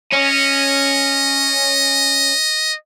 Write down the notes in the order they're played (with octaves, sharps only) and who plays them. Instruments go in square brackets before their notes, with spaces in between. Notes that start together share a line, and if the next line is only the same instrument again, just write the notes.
[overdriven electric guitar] C#4 [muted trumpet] D#5